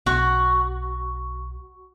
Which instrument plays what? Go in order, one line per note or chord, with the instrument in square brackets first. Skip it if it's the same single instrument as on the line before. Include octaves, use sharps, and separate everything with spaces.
[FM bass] B1 [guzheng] F#4